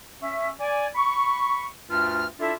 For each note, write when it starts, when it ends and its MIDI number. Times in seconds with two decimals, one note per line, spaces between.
0.22 0.50 61
0.22 0.50 76
0.60 0.87 74
0.60 0.87 80
0.95 1.66 83
0.95 1.66 85
1.90 2.26 38
1.90 2.26 43
1.90 2.26 65
1.90 2.26 89
2.39 2.52 62
2.39 2.52 64
2.39 2.52 65
2.39 2.52 69
2.39 2.52 76